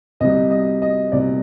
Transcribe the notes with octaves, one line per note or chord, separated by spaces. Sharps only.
C2 C3 G3 D#5
D#5
D#5
C2 C3 G3 D5